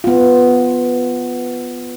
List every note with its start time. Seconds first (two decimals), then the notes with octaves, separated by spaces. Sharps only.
0.04 B3 F4